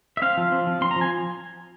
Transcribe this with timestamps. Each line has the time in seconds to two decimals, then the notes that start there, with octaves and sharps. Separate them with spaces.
0.17 E5
0.22 C4 F5
0.37 F3
0.52 C4
0.67 F3
0.81 C4 C6
0.91 A#5
0.96 F3
1.01 G#5